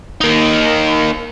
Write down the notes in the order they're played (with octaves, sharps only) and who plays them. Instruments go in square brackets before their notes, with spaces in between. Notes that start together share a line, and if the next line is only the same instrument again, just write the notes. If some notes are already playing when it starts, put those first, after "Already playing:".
[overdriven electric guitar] A#3 D#4